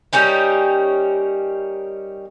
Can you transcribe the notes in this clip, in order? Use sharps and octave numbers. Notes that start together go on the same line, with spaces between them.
G3 A#3 C#4 D#4